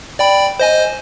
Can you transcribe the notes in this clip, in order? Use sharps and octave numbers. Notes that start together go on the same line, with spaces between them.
D5 G5 B5
C5 D#5 G#5